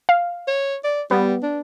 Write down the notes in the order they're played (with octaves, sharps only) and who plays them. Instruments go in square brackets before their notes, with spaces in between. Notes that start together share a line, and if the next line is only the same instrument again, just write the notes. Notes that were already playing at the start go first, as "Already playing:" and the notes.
[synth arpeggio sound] F5
[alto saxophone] C#5
D5
[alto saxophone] G3 [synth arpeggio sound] B3
[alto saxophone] D4